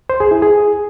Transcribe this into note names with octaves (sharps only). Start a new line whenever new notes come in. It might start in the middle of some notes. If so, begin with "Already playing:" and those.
C5
G#4
E4
G#4